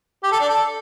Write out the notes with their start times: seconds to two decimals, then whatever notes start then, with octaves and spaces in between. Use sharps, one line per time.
0.23 G4
0.32 A4
0.40 D4
0.49 A4